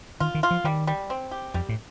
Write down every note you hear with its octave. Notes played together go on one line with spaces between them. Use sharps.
D#3 F4
D#3
F4
F3
D#3 G3
G3
C4
G4
F2 G3
A2